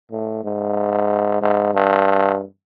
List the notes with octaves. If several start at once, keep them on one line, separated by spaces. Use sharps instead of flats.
A2
G#2
G#2
G2